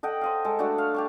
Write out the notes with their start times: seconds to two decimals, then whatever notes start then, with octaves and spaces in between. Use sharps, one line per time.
0.03 A4 D#5 F#5 G5
0.21 C5 D#5 F5
0.45 G#3 A4
0.59 A3 D4 F#4 C#6
0.78 F5
0.94 G4 A5 C#6